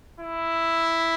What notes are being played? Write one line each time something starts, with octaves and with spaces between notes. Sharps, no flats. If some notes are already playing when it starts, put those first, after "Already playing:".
E4